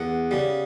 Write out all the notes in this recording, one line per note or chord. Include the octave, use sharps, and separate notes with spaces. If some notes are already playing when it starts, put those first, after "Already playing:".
Already playing: E2 F#5
C#3 G3